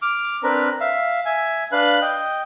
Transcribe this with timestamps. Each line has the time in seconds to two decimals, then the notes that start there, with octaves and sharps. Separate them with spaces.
0.02 D6 F6
0.43 C4 D4 A#4 B4
0.80 E5 F5
1.25 E5 G#5
1.72 D4 B4 F5 F#6
2.02 D#5 G5